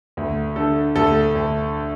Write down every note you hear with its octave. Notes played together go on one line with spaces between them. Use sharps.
D2
D3 A4
D2 A4
D2